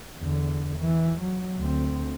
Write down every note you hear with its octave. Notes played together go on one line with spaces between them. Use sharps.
E2 D3
E3
F#3
D2 C4